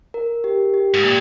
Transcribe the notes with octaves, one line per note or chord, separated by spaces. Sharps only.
A#4
G4
G4
G#2
A#2 G5